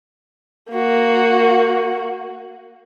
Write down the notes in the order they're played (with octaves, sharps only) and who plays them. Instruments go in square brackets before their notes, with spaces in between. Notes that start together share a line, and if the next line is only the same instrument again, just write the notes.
[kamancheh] A#3 F#4